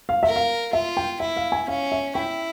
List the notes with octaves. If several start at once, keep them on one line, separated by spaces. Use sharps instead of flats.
F5
A#4 E5
F5
F4 E5
G5
E4 E5
F5
G#5
C#4 F5
E5
E4 G5